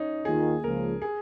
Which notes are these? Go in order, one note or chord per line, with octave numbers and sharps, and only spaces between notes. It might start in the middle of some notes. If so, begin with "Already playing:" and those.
Already playing: C#4 D#4
D#2 D#3 A#3 F4 G#4
C#2 C#3 F3 A#3 A#4
G#4